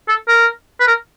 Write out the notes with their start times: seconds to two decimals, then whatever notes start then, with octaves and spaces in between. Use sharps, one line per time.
0.08 A4
0.28 A#4
0.80 B4
0.88 A#4